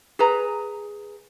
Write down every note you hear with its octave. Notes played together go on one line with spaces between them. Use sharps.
G#4 B4 A#5